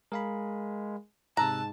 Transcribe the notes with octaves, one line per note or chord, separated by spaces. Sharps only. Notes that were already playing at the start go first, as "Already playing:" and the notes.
G#3 A#4 F5 B5
G#2 C3 A5 A#5 E6 F#6